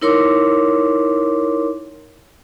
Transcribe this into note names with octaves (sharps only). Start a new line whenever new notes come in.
D#4 E4 A#4 C#5 C6 D6